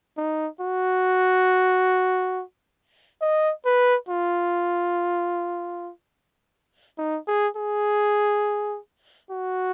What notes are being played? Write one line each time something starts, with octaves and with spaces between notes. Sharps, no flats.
D#4
F#4
D#5
B4
F4
D#4
G#4
G#4
F#4